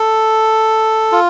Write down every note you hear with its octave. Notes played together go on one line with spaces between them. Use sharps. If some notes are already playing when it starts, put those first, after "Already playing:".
Already playing: A4
F4